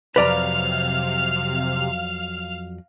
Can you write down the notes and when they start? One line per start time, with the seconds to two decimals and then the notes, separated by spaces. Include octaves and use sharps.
0.16 F2 C3 F#3 B4 D5 F5 A#5 F6